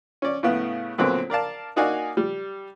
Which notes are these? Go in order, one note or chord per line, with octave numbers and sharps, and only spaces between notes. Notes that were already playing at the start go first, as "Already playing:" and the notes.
C#4 D5
A2 C#3 B3
A#2 D3 F#3 B3 C4
A#4 D5 F5 A5
A#3 D#4 F#4 D5 F5 G#5
G3